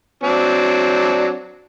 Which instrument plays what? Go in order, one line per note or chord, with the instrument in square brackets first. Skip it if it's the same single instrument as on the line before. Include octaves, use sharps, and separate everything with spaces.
[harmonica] F#3 C4 D4